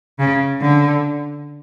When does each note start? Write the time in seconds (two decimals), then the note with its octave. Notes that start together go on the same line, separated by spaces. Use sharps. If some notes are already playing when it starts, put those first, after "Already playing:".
0.19 C#3
0.61 D3